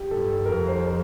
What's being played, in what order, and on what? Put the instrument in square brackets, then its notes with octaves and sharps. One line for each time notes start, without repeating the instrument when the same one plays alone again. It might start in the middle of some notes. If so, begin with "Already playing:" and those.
Already playing: [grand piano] G4
[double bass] G2 [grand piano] A4
[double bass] F2 [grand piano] A#4
[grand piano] C5